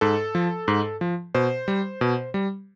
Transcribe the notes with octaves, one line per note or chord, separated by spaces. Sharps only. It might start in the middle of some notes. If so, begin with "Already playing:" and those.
G#2 A4
F3
G#2
F3
B2 C5
G3
B2
G3